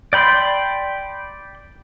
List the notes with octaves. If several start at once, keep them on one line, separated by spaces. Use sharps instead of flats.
D5 G5 B5 C6